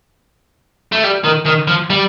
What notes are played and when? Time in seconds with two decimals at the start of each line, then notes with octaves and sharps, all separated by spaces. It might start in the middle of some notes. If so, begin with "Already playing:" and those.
0.92 A3
1.04 G3
1.24 D#3
1.46 D#3
1.67 F3
1.90 G3